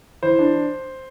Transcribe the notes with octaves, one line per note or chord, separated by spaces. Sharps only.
E3 C5
D4